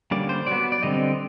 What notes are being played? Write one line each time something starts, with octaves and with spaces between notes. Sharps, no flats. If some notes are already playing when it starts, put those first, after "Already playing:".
D3 G3 A#3 C#4 D5
C5
F#3 B3 D5
D5
D3 G3 C4 D#5